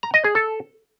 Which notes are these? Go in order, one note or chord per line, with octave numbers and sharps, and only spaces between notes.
A#5
D#5
G#4
A4